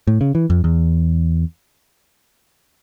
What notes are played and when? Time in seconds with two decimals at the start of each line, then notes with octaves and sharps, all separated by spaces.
0.07 A2
0.21 C#3
0.35 E3
0.50 F2
0.64 E2